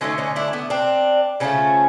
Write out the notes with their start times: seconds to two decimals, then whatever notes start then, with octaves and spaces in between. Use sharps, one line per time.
0.01 D3 F#3 A3 C#4 D#4
0.18 C#4 D#4
0.36 D4 E4
0.53 A3 B3
0.70 C4 D4
1.40 C#3 F3 A3 C#4 D#4